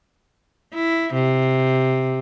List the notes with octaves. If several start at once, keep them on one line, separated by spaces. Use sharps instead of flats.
E4
C3